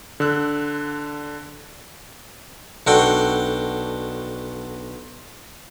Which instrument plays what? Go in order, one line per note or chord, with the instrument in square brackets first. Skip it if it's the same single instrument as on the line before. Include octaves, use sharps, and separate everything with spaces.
[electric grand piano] D3 E6 F#6
[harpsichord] B1 D4 F#4 A4 G5